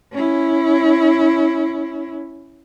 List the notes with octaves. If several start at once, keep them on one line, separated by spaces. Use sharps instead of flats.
C#4 E4